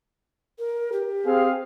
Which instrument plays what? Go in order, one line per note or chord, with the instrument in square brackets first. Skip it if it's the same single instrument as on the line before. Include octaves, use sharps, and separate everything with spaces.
[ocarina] A#4
G4
[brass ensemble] C4 G#4 F5